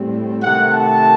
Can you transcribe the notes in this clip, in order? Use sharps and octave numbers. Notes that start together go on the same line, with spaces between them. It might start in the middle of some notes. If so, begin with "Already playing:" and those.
Already playing: A2 G3 C4
C3 D#3 A3 F#5
A5